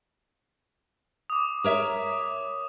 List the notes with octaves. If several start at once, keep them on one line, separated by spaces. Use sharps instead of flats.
D6 D#6
A#4 C#5 E5